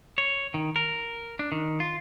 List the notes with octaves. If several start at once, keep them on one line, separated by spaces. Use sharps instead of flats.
C#5
D#3
A#4
D4
D#3
F4